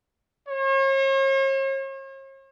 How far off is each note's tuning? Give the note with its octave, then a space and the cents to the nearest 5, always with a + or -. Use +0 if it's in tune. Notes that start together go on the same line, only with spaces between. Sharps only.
C#5 -45